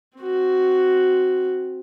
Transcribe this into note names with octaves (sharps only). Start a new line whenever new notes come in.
C4 F#4